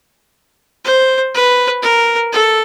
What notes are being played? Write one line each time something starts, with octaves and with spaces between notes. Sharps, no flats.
C5
B4
A#4
A4